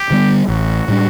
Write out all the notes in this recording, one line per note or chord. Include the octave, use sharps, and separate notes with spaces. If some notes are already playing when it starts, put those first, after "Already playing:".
Already playing: G4
D3 G3 B3
A1 F#4
A2 G3 D4